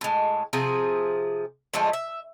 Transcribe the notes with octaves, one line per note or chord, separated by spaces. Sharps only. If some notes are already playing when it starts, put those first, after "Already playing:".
A2 G#3
C3 F3 G#4
D3 F3 G#3 A3
E5